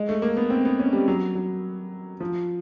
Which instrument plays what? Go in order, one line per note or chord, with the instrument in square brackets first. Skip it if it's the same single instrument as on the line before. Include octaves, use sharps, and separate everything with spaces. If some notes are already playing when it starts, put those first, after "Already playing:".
Already playing: [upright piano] G#3
A3
A#3
B3
C4
B3
C#4
G3
F#3
F#3
F3